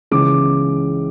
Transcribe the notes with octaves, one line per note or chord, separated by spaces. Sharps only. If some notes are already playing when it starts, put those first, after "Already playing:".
C#2 C#3 E3 D6